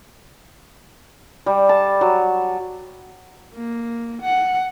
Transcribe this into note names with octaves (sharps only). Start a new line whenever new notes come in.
G3
A5
F#3
A#3
F#5